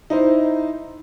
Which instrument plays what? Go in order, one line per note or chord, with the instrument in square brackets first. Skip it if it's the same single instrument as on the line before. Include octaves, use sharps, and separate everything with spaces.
[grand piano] D#4 E4 C5